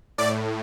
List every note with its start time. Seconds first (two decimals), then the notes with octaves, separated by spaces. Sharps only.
0.18 A2 D5